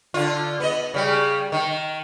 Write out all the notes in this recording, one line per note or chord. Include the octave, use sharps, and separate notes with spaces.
D3 F4
B3 D#5
C#3 G3
D#3